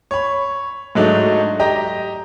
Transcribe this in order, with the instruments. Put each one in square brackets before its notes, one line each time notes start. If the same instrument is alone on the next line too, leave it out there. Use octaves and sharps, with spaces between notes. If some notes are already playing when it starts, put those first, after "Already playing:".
[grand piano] C#5 B5
G#2 F#3 A3 D4 D#4
G4 D#5 A#5